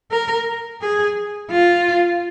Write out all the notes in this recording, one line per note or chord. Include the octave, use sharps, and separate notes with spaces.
A#4
G#4
F4